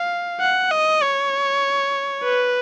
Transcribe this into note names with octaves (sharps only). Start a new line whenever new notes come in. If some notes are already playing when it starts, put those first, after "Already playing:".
Already playing: F5
F#5
D#5
C#5
B4